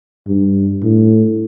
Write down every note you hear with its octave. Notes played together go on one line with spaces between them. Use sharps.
G2
A2